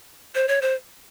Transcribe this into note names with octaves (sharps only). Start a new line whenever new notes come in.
C5
C#5
C5